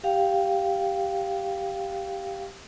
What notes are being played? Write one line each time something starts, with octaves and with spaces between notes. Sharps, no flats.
G4 F5 G5